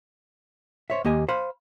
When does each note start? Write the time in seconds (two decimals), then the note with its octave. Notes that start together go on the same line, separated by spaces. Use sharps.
0.90 C5 C#5 E5
1.05 D#2 A#3 G4 D#5 G#5
1.29 C5 F5 B5